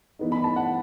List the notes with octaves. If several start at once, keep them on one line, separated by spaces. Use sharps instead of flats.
E3 B3 D#4
B5
A5
F#5